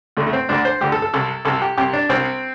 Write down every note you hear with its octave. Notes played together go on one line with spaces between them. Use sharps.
D2 D3 A3
A3
C4
D2 D3 D4
C5
D2 D3 G4
A4
A4
C2 C3 A4
C2 C3 A4
G4
C2 C3 G4
D4
C2 C3 C4